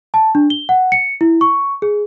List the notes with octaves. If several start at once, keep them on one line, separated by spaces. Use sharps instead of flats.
A5
D4
G7
F#5
C#7
E4
C#6
G#4